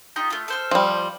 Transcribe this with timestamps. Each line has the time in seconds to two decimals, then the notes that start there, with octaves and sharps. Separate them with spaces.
0.16 D#4 F4 G4
0.30 A3 F4
0.48 A4 C5 F6
0.71 F3 G3